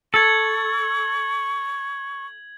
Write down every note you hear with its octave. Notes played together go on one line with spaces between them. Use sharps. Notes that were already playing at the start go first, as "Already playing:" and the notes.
A4 C#6 G#6 F#7